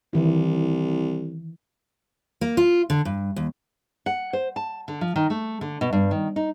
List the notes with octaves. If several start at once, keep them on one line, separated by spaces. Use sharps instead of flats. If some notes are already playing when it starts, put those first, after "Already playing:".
C2 D#3 E3 E4
A#3
F4
D3
G2
D#2
F#5
C5
A5
D3
F3
D#3
A3
D3
B2
G2
D#3
D#4